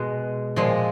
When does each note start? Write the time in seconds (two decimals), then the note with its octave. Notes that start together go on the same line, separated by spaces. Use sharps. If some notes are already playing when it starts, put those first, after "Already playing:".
Already playing: B2 G#3
0.56 A#2 F3 G#3